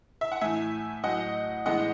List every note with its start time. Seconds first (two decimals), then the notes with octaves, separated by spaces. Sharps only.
0.21 E5
0.32 F#5
0.41 A2 E3 A3 E5 G#5
1.04 A2 F#3 A3 D#5 F#5
1.66 A2 E3 G#3 B3 D#5 F#5